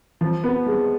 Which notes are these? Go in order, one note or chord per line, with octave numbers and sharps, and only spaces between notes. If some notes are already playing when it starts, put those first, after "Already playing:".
F3
B3
G#3